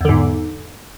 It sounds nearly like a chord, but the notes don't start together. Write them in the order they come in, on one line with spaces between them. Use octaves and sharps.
E2 D3 G#2